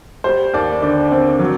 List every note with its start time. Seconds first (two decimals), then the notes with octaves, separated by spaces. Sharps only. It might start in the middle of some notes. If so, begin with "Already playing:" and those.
0.24 G3 C5
0.53 D#2 D5
0.82 D3 D5
1.11 C4
1.39 F#3